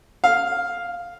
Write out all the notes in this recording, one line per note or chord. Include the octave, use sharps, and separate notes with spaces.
F5